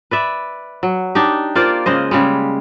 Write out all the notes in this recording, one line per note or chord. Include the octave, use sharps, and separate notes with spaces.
B4 D5 E5
F#3
D4 D#4 G4
A#3 F4 C5 D5
C#3 G#3 C5 D#5
C#3 G3 G#3